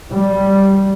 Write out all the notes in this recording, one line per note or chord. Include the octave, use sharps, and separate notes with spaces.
G3